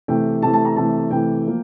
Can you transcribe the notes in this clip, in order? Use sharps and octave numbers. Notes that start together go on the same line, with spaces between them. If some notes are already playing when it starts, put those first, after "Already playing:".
C3 E3 A3 G5
C3 E3 A3 A5
A5
A#5
C3 E3 A3 A5
C3 E3 A3 G5
F3 A#3